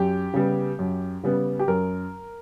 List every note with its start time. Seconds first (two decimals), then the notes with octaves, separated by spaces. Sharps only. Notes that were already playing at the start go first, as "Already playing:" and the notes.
Already playing: F#2 G4
0.34 C#3 G3 B3
0.79 F#2
1.24 C#3 G3 B3
1.59 G4
1.68 F#2 A#4